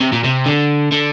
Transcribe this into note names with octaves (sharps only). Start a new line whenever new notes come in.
C3
A#2
C3
D3
D3